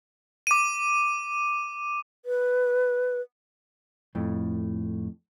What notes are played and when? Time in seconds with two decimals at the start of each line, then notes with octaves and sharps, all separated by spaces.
0.47 D6 D#7
2.25 B4
4.15 F2 A2